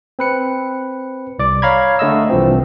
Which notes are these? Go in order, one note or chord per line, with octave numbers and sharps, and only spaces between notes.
C4 B4 C#7
C2 D5 D6
C#5 F5 A#5 B5 G#6
D3 A3 D#5 E6
C2 E3 F3 C4